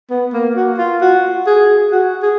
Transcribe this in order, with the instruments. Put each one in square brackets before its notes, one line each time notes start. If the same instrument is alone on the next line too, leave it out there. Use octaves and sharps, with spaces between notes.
[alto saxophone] B3
A#3
F#4
F4
F#4
G#4
F#4
G#4